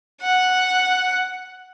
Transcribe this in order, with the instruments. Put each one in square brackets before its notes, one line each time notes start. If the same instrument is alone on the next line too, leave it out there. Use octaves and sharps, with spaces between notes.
[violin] F#5